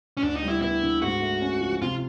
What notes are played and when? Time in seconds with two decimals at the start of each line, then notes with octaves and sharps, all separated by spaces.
0.17 C#4
0.23 D2 D4
0.36 D#4
0.43 G3
0.49 E4
0.62 B3 E4
0.83 D3
1.02 G#2 F#4
1.22 A3
1.41 C#4
1.61 F3
1.82 C3 F4